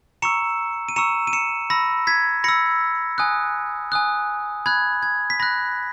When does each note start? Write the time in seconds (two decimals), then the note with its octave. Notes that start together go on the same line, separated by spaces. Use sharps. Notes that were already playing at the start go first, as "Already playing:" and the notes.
0.22 A#5 C#6 E6 C#7 E7
0.89 D#7
0.96 A#5 C#6 E6 C#7 E7
1.27 D#7
1.33 C#7 E7
1.70 B5 E6 A#6
2.07 G#6 B6
2.44 B5 E6 A#6 C#7
3.18 G#5 D#6 F#6
3.92 G#5 D#6 F#6
4.66 B5 F#6 G#6
5.02 G#6
5.30 B6
5.40 B5 F#6 A#6